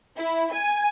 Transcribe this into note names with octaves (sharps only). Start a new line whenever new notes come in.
E4
G#5